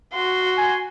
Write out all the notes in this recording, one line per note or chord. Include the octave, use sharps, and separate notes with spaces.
F#4 C6
G#5